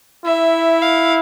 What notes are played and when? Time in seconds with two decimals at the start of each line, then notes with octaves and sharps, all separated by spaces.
0.25 E4 E5
0.82 F5